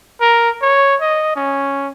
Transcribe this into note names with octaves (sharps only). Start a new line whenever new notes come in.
A#4
C#5
D#5
C#4